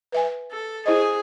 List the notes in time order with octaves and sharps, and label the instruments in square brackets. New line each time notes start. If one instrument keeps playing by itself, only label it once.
[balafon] B4 E5 G#5
[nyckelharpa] A4
[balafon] E4 C5 D#5 [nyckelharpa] G#4